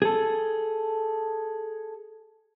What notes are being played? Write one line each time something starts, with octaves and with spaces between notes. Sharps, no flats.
G#4 A4